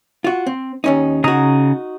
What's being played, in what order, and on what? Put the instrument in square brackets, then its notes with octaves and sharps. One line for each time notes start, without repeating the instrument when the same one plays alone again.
[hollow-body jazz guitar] F4 F#4
C4
D#2 C#4 D#4
[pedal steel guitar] C#3 A#5 D#6 [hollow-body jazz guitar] D#4 F#4